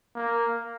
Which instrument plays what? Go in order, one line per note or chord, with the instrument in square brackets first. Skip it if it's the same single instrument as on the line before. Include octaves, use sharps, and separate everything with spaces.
[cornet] A#3